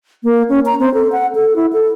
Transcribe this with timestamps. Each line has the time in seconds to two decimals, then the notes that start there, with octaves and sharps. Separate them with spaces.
0.24 A#3
0.49 C#4
0.66 A#5
0.80 C4
0.94 A4
1.12 F#5
1.35 A4
1.56 E4
1.73 A4